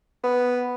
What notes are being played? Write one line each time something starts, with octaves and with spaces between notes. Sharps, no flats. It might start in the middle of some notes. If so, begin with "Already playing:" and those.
B3